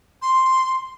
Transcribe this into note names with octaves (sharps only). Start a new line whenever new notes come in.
C6